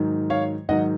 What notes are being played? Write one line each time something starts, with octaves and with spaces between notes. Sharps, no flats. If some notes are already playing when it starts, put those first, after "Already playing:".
Already playing: G#2 D#3 F#3
C#5 F5
G#2 D#3 F#3 D#5 F#5